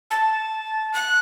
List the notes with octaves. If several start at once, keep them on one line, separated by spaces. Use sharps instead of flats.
A5
F#6